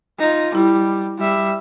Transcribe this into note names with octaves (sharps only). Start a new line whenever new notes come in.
D#4 F4
G3 E4
G3 E5